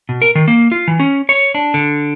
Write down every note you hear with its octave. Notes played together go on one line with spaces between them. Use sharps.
B2
A#4
D#3
A#3
F4
E3
C#4
C#5
D4
D3